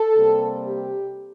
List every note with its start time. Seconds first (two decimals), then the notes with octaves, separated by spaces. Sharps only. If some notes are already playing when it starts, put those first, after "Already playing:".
Already playing: A4
0.15 C3 G3 A#3
0.66 G4